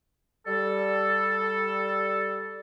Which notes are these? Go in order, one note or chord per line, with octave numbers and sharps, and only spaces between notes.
G3 A4